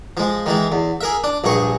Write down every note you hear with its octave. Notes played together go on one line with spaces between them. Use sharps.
F3 G#3
D#3 E3 G#3
E2
G#4 A#4 E5
D4
A#1 G2 G#4 C#6